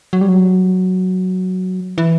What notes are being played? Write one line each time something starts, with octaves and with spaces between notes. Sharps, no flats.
F#3
G3
F#3
E3